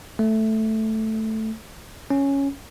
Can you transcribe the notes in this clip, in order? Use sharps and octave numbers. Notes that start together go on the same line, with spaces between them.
A3
C#4